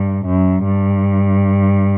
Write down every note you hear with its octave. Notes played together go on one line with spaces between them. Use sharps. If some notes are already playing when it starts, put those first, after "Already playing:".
Already playing: G2
F#2
G2